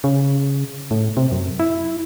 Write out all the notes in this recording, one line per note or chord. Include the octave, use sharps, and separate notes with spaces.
C#3
A2
C3
F#2
E4